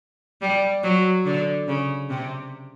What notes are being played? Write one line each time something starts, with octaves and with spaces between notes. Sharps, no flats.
G3
F#3
D3
C#3
C3